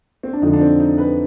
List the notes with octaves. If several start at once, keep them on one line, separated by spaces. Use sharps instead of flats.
C4
D4
F2 D3 F3 D#4
D4
C4
D#4
B4